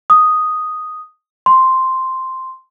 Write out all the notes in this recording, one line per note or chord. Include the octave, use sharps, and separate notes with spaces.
D#6
C6